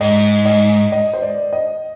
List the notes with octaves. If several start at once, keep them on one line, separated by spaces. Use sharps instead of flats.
G#2 D#5
D#5
D#5
C5
D5
D#5